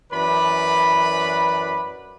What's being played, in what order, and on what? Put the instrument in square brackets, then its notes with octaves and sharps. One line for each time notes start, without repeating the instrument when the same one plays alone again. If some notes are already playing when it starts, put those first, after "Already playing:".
[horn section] F#2 E3 B4 D5 B5